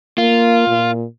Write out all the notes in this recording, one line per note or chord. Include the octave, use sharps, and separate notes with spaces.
A#3 F4
A#2